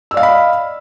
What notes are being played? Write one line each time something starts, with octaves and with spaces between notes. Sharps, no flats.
D5 D#5 F5 B5 E6